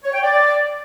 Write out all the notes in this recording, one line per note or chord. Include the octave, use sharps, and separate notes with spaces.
C#5
G5
D5